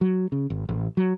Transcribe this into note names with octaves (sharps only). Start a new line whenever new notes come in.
F#3
C#3
G#1
A1
F#3